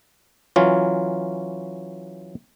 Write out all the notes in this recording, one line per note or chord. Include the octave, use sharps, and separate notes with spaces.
E3 F#3 C#4 F4